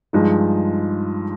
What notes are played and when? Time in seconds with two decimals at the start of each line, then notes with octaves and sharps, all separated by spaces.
0.13 G2 F3 G#3 D#4